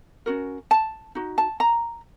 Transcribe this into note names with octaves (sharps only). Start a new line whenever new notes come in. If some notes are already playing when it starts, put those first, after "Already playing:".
C#4 F#4 A#4
A5
D#4 F#4
A5
A#5